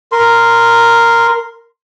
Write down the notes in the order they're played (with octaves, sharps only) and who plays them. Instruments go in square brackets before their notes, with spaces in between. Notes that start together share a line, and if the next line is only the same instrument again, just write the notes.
[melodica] A#4 C6